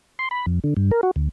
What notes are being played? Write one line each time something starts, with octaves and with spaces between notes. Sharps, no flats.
C6
B5
F2
D3
G2
A#4
F#4
D2